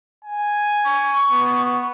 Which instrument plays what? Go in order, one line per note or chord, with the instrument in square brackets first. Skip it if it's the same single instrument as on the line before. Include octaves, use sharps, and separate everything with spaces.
[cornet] G#5
[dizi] C#6
[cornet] B3